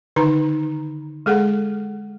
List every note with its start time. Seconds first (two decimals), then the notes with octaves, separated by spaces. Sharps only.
0.16 D3 D#3 D#4 B4 A#5
1.26 G#3 G#4 A4 F#5